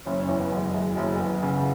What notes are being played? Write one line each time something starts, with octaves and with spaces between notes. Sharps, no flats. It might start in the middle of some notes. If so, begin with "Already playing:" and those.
F#1 C#4
C#4
E2
B3
F#1
G#3
F#1 G#3
F#1 F#3
G#3
F#1 B3
C#3